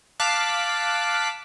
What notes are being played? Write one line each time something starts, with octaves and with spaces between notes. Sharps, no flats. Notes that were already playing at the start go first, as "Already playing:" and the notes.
F5 A5 D6 F#6 B6